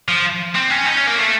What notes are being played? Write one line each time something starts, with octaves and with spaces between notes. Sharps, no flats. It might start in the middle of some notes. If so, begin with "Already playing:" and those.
F3
C4
C#4
D#4
C#4
A#3
A3